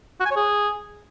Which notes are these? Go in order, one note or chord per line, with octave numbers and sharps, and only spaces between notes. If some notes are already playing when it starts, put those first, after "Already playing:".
F#4
G#5
C#5
G#4